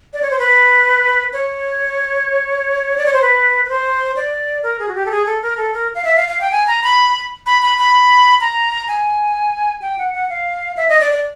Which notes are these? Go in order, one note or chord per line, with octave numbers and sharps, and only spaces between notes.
D5
C#5
C5
B4
C#5
D5
C#5
C5
B4
B4
C5
D5
A#4
G#4
F#4
G4
A4
G#4
A4
A#4
A4
A#4
F5
E5
F5
F5
G5
G#5
A#5
B5
B5
B5
B5
A#5
G#5
G5
F#5
F#5
F5
E5
D#5
D5
D5